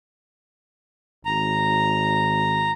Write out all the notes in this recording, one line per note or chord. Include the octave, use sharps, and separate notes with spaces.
G#1 A#5